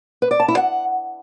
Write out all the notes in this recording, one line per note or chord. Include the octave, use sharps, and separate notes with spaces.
B4
D5
A5
E4
F#5